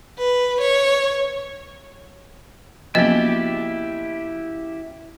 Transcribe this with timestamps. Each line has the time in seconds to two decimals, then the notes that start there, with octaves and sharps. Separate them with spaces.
0.18 B4
0.61 C#5
2.95 C#3 F3 F#3 A#3 B3 E4 G4 D#5